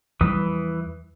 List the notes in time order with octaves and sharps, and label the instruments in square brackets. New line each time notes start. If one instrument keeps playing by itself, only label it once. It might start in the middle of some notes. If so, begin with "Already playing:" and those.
[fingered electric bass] E2 F3 G3 [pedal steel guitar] E3 B4 D#6